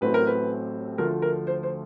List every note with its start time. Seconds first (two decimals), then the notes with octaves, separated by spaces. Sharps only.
0.01 A1 A2 F#3 A3 C4 B4
0.14 A#4
0.27 B4
0.98 D2 D3 F3 A3 A#4
1.22 A#4
1.47 C5
1.63 C5